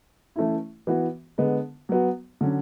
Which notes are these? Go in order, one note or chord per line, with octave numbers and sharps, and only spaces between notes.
E3 A3 C#4 E4
E3 B3 F#4
D3 G#3 B3
F#3 B3 F#4
D3 F#3 C#4